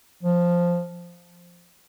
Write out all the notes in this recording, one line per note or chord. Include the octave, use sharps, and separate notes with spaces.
F3